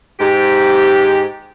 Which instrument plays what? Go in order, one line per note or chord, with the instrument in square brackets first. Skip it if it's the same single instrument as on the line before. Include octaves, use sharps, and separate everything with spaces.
[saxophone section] G#2 G4